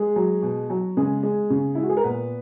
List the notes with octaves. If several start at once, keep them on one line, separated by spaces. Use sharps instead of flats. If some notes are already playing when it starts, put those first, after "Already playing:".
Already playing: G#3 G#4
F#3
B2
F#3
C#3 G#3 G#4
G#3
C#3
G#3 E4
F#4
G#4
A#4
A#2 B3 B4